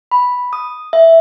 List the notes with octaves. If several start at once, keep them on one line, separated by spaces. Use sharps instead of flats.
B5
D#6
E5